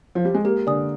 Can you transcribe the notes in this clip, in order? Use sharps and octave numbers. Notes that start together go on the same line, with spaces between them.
F3
G3
G#3
A#3 G4
D3 D5 G#5 D#6